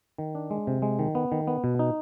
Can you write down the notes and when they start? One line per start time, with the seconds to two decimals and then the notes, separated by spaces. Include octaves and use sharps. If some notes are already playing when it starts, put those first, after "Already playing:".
0.18 D#3
0.35 D4
0.50 G#3
0.67 C3
0.82 G#3
0.99 D#3
1.15 B3
1.32 D#3
1.47 B3
1.64 B2
1.79 D#4